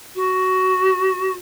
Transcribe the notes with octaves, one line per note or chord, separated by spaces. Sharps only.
F#4